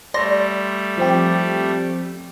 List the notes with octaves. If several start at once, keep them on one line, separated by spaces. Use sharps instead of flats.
G3 A3 D5 C6 A#6
F3 C4 G4